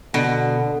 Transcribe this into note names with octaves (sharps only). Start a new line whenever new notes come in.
B2 D3